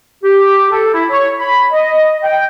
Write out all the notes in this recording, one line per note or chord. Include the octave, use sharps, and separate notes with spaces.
G4
A4
E4
C#5
B5
D#5
G5